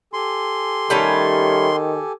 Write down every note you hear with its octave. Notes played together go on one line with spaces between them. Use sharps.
G4 A4 G#5 C6
D#3 G3 A3 C#4